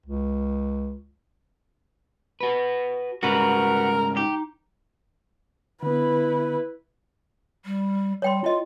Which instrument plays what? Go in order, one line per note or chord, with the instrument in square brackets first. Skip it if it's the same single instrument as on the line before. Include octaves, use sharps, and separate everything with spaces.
[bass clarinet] C#2
[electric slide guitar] F#4 B4
[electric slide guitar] G#2 C#3 G3 [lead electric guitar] F#4 B4 [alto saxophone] A#4 [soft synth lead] A#5
[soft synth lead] D#4 [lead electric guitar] G4
[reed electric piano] D3 B3 [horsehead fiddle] E4 B4
[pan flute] G3
[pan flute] G3 [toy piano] C#5 G5 C6
[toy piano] E4 D#5 [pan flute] F4